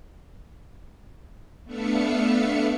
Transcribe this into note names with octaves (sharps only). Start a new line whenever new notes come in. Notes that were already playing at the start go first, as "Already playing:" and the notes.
A3 B3 D4 E5 F5 C#7